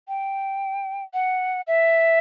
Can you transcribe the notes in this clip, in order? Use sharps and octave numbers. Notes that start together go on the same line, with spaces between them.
G5
F#5
E5